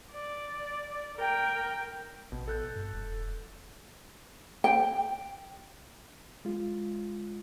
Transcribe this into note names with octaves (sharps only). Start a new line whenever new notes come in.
D5
A#4 G5
A1 B2
A4 F#6 G6
G2
E1
G5
G#3 F4